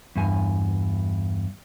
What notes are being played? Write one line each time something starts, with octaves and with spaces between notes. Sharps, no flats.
E2 G2 G#5